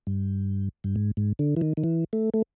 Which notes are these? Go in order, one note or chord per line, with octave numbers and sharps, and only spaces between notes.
G2
G2
G#2
G#2
D3
E3
D#3
D#3
E3
A3
A3